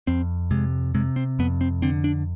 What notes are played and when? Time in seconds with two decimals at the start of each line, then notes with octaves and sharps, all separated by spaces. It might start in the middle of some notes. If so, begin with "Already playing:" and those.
0.07 F2 C4
0.51 C3 G#3
0.95 C3 G#3
1.16 C4
1.39 F2 B3
1.61 C4
1.82 D3 C4
2.04 D4